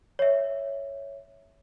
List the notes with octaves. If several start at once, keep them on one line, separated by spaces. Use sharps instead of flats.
C#5 E5